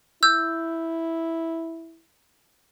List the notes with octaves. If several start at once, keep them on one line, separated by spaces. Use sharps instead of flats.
E4 E6 G6